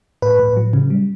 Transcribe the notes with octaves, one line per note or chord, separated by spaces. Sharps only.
A2 B4
A2
F#3
C#3
G3